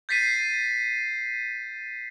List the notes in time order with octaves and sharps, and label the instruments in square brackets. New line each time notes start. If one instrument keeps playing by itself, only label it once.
[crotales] G6 A6 B6 C7 D#7